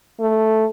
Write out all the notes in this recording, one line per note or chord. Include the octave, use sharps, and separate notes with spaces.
A3